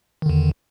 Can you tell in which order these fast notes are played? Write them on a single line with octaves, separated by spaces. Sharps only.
D#3 D3 E2